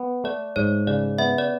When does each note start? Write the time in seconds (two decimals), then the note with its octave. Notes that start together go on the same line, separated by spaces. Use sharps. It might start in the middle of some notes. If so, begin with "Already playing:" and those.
Already playing: B3
0.24 A3 D5
0.56 G#2 C#5
0.87 C#3 D5
1.18 B3 E5
1.38 D5